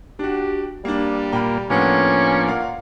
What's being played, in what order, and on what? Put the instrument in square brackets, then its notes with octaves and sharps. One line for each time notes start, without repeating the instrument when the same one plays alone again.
[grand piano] D4 F#4 [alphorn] G4
[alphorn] G3 [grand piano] A#3 D4
[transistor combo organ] A#2 A#3 [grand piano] G5 B5 F6
[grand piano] A2 B3 A4 [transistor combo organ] F3 A#3 D4 [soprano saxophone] C#4
[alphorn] A#2 [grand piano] A#4 F5 F#5